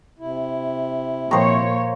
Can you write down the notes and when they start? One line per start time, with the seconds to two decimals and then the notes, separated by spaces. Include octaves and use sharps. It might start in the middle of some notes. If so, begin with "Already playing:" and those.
0.19 C3 E4
1.31 A#2 F3 A#3 C5 C#5 G5 A#5 C#6